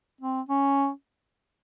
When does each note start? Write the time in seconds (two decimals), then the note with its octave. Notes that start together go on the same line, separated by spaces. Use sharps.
0.21 C4
0.49 C#4